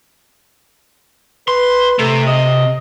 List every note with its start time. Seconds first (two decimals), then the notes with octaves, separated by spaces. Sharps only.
1.48 B4 C6
1.99 C3 A3
2.27 D#5